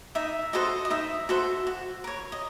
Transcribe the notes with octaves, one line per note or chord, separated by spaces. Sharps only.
D#4 E5
F#4 A4 C5 D#5
D#5
D#4 E5
F#4 A4 C5
F#4
A#4 C#5
D#5